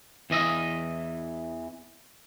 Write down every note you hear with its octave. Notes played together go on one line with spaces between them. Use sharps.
E2 E3 D#5 E5